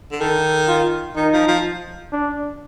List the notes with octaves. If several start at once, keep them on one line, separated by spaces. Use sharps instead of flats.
D3
D#3 A4
F4
D#3 D#4
F3
F3
D4